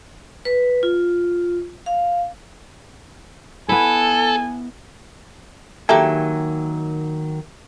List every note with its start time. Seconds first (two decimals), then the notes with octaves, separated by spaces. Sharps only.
0.45 B4
0.83 F4
1.86 F5
3.69 B3 E4 A4 G#5
5.89 D#3 F#3 A#3 G4 A4 E5 G#5